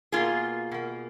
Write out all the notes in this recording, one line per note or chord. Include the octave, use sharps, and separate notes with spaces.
B2 A#3 F4 G#4
B2 A#3